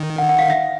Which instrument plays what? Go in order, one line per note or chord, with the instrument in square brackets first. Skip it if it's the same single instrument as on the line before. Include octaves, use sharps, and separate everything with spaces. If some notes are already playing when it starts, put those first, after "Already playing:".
Already playing: [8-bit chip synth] D#3
[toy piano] F#5
F#5
F5
E5